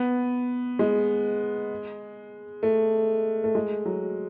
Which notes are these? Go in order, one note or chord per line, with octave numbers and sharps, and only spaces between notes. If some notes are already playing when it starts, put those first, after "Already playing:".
Already playing: B3
G#3
A3
A3
G#3
F#3